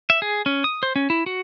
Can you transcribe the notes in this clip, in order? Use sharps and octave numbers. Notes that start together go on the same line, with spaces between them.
E5
G#4
C#4
D#6
C5
C#4
E4
F#4